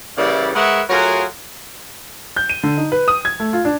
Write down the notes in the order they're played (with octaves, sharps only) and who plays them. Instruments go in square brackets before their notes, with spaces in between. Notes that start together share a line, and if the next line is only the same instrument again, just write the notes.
[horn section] C#3 E3 G3 A#3 E4 D5
G#3 A#4 B4 C#5 E5 F#5
F#3 A3 F4 F#4 G#4 A#4
[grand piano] G6
D#7
D3
D#4
B4
D#6
G#6
A3
F4
D4